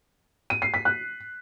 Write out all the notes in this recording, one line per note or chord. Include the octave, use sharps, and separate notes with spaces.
D#7
C7
B6
F#6